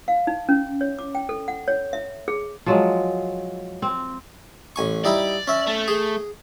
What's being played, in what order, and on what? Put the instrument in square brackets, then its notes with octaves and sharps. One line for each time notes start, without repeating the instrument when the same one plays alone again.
[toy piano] F5
D#4
C#4
C#5
D6
G5
A4
F#5
C#5
E5
G#4
[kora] F3 F#3 G#3
C4
[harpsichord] A1 G#5 C#6
[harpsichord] G3 D#4 E4 [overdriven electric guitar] D5
[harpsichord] C#4 E5
[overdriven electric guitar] A3
[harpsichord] G#4